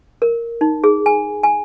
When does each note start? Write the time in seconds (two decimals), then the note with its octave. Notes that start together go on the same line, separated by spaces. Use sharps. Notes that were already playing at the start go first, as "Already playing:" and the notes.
0.22 A#4
0.61 D#4
0.84 G#4
1.06 G#5
1.43 G#5